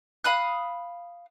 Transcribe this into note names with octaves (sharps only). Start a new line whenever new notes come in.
F5 B5 D#6 F#6